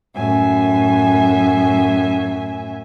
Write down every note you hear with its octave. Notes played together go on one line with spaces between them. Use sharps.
F#2 A2 E5 G#5